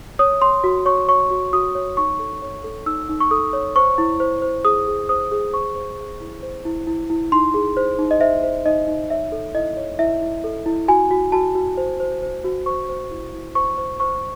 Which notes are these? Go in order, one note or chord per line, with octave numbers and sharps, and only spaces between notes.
C#5 D#6
C#5 C6
F#4
C#5 C#6
C#5 C#6
F#4
F#4 D#6
C#5
D#4 C#6
A4
C#5
A4
D#4 E6
D#4
C#6
A4 D#6
C#5
C5 C#6
E4
C5
C5
G#4 D#6
G#4
C5 D#6
G#4
C5 C#6
C5
G#4
E4
C5
E4
E4
E4
D#4 C6
G#4
C5
D#4
D#5
C5 E5
C5
D#4 D#5
D#4
C#5 E5
A4
E4 D#5
C#5
E4 E5
E4
A4
E4
F#4 G#5
F#4
F#4 A5
F#4
C5
C5
C5
F#4
C5 C#6
C5
E4
E4
C5 C#6
C5
C5 C#6